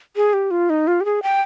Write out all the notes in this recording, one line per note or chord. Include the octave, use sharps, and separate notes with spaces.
G#4
G4
F4
D#4
F4
G4
G#4
G5